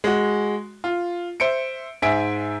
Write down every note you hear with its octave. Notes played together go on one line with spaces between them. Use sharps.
G#3 F#4
F4
C5 E5 C#7 D7
G#2 E5 G#5 B6 D7